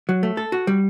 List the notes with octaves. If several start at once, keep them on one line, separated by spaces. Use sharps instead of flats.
F#3
A3
A4
F#4
G3